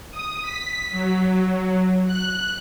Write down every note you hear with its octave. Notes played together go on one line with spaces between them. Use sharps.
D#6
B6
F#3
F#6